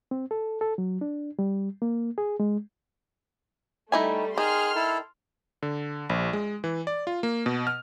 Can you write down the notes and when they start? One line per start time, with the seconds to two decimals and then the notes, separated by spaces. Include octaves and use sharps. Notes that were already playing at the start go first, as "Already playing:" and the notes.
0.11 C4
0.31 A4
0.61 A4
0.78 F#3
1.01 D4
1.39 G3
1.82 A#3
2.18 G#4
2.40 G#3
3.92 G3 A3 D#4 E4 G#5
4.38 D#3 G#4 C6 F6
4.75 E4 A4
5.62 D3
6.10 A#1
6.33 G#3
6.64 E3
6.87 D5
7.07 F4
7.23 A#3
7.46 B2
7.67 F6